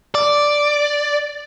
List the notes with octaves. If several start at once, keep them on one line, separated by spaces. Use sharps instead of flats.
D5